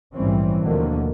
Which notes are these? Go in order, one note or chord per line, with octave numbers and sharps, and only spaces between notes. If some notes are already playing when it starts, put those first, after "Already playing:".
A#1 G#2 E3 G3 C4 C#4
D#2 B2 D3 F3 A3 A#3